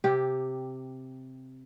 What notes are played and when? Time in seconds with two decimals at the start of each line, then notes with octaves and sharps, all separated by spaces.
0.04 C3 G4